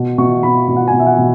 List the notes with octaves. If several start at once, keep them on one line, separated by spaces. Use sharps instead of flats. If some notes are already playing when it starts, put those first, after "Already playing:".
Already playing: B2
B2 C#6
B2 B5
B2
F#5
G#5
B2
E5
F#5
B2